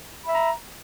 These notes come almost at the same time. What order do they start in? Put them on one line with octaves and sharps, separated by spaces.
B5 E5 A#5